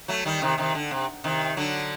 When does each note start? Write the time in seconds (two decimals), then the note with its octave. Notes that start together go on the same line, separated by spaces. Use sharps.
0.08 F#3 A3
0.25 D#3 G3
0.42 C3 D#3
0.58 C3 D#3
0.75 D3
0.91 C3
1.24 C3 D#3
1.57 D3 F#3